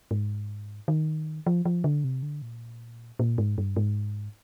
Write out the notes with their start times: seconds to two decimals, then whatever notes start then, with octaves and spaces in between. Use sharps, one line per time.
0.11 G#2
0.88 D#3
1.47 F3
1.65 F3
1.84 D3
2.04 C3
2.22 D3
2.42 A#2
3.19 A#2
3.38 G#2
3.58 G2
3.76 G#2